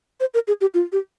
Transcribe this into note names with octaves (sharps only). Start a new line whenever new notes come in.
C5
A#4
G#4
G4
F4
G4